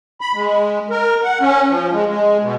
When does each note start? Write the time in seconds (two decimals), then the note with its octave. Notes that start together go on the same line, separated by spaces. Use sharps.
0.21 B5
0.35 G#3
0.90 A#4
1.23 F#5
1.40 C#4
1.69 F3
1.93 G#3
2.07 G#3
2.42 B2